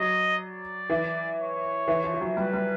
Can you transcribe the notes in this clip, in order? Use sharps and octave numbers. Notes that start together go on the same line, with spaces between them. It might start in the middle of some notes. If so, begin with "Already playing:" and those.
Already playing: F#3 D#5
D5
E3
C#5
E3
F3
F3
F#3
G3 B4
G3